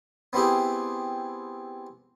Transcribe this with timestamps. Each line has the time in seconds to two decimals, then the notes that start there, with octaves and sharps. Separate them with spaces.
0.33 B3 C4 E4 G4 G#4